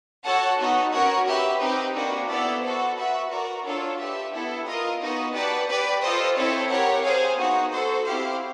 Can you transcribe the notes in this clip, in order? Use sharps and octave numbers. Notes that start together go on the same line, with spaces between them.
F#4 A4 C#5 F#5 A5
B3 D#4 F#4
C#4 F#4 A#4 C#5
G4 B4 E5
C4 D#4 G4 B4
A#3 D4 F#4 B4
B3 E4 A4 D5
F#4 A4 C5
F#4 B4 E5
F#4 A#4 D5
D4 F4 A4 C#5
G4 B4 E5
B3 E4 A4
F4 A#4 D#5
B3 D#4 F#4
G4 B4 D5 F#5 A5
G4 B4 D5
F4 A4 C5 D#5
C4 E4 A4 C#5
G4 A#4 C#5 F#5
G#4 C5 F5 G#5
B3 D#4 F#4
F#4 A4 C5
C4 E4 G4 C5 F5